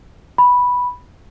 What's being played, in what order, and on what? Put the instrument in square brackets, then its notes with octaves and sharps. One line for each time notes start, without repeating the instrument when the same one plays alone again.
[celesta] B5